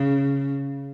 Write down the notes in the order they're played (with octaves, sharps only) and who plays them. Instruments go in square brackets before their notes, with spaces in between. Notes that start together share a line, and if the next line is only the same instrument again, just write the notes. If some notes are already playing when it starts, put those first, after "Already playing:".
Already playing: [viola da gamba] C#3